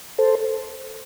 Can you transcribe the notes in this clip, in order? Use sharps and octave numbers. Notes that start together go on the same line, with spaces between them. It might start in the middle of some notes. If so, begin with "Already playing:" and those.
A4 C5